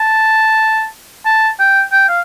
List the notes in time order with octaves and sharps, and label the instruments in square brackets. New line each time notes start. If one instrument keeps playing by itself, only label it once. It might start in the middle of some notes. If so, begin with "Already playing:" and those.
Already playing: [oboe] A5
A5
G5
G5
F5